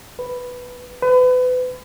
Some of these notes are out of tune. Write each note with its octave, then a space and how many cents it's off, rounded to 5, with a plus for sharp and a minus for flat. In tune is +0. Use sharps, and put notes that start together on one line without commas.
B4 +0
B4 +30